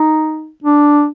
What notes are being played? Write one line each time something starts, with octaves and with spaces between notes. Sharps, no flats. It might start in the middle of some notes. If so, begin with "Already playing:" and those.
Already playing: D#4
D4